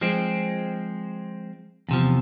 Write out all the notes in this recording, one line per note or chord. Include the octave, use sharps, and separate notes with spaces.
F3 G#3 C4
E2 C3 F3